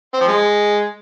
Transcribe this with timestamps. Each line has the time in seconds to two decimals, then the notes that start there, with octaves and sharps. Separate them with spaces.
0.14 C4
0.21 F3
0.28 G#3